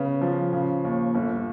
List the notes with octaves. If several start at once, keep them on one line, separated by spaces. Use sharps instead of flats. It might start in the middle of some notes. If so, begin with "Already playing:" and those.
Already playing: C#3 B3
F3
C#3
D#2
G1